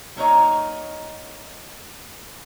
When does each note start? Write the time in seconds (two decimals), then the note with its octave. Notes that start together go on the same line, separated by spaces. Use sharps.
0.16 F#3 A#3 D#4 B4 C#5 D#5